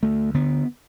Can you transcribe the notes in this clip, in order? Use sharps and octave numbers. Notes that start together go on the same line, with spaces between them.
D2 A3
D3 B3